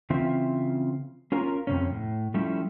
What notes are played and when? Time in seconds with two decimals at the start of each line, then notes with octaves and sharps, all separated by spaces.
0.10 C#3 E3 C4 F4 E5
1.32 C#4 F4 A#4 A#5
1.67 F2 C3 C#4
1.91 A2
2.34 F3 G3 A3 C#4 E4